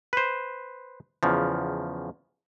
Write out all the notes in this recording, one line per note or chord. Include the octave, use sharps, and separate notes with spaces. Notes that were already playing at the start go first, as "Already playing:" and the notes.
B4 C5
E2 C#3 F3